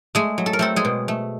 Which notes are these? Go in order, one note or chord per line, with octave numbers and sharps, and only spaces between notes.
G#3 A3 G#4
F#3
A4
A#4
A3 C4 A4
G#3 G#4
B2
A3